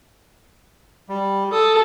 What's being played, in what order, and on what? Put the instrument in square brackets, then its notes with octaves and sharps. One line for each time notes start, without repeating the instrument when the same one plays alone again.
[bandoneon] G3
[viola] A4 [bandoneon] D#6